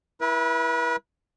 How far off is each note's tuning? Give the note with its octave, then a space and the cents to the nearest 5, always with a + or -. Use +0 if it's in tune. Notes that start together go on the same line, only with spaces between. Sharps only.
E4 +0 B4 -35